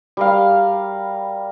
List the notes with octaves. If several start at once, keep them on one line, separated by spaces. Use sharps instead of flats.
G3 A#4 F5